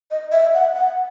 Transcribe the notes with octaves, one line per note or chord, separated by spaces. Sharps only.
D#5
E5
F#5
F#5